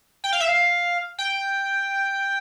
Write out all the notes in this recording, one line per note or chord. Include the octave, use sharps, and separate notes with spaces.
G5
F5
E5
F5
G5